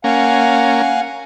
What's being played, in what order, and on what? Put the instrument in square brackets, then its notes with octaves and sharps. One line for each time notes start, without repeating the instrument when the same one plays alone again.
[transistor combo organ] A#3 C#4 [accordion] F5 F#5 G#5